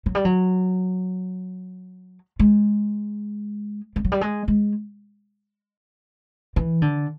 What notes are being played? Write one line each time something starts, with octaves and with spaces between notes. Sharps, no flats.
F#3
G3
F#3
G#3
G3
F#3
G3
G#3
G#3
E3
D3